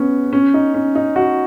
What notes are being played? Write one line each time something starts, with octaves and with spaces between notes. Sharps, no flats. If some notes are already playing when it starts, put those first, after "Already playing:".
Already playing: B3 C#4
C#4
D#4
C#4
D#4
F#4